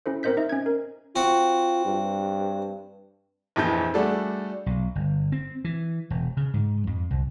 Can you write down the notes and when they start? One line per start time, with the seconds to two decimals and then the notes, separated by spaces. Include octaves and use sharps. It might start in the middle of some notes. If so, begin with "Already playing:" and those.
0.06 C#4 E4 A4 C5
0.23 C4 A#4 C5 D#5 G6 B6
0.37 D#4 D#5 E5
0.49 C#4 G#6
0.66 A#4
1.16 C4 F4 F#4
1.86 G2
3.56 A#1 F2 E3 G6
3.94 G3 A3 D4 F#4 G#4 A4
4.66 B1
4.95 G1
5.32 C4
5.65 E3
6.10 E1
6.37 C#3
6.54 G#2
6.87 F2
7.11 C2